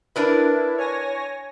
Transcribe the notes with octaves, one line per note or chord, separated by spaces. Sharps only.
D4 E4 A#4 B4
C#5 G#5 A#6